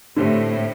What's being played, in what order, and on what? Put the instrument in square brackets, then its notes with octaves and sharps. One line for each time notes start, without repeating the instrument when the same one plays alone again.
[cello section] A2 [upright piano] D3 A3 C4 G4